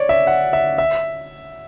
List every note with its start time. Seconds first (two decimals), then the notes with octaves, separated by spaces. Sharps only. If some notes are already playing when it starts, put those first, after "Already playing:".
Already playing: C#5 D5
0.09 E5
0.27 F#5
0.53 E5
0.78 E5